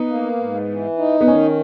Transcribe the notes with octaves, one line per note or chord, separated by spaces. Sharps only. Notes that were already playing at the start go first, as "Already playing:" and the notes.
Already playing: B3 D#4
A#3
G#2
E3
D#4
B3
D#3 C#4